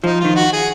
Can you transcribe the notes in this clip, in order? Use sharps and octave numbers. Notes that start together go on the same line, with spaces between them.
F3 D#4
D#3 F4
F#4
G#4